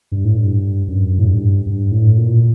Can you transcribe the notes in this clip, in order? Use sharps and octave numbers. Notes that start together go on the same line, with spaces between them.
G2
A2
G2
F#2
A2
G2
G2
A2
A#2